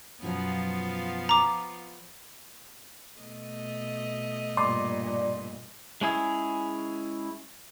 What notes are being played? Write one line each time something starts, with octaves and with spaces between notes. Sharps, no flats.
F#2 B2 F3 F#3 B3 F4
A#5 D6
B2 A3 D#5
G2 A#2 D5 C6
G#3 C#4 E4 G#4